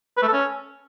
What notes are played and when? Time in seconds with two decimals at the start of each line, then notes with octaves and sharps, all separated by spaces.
0.17 B4
0.22 A3
0.28 A4
0.33 C#4